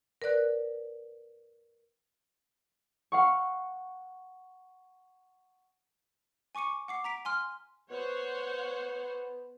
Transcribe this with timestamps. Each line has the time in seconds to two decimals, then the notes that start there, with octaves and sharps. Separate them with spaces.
0.22 A#4 B4 D5 F#6
3.12 F5 F#5 C#6
6.55 G#5 C#6 D6 C#7 D#7
6.88 F#5 D6 C7
7.04 A#5 B6 D7
7.25 G#5 C6 F6
7.90 B3 C5 C#5 F#5